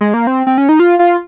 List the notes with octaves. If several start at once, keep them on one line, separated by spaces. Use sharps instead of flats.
G#3
A#3
C4
C4
C#4
D#4
F4
F4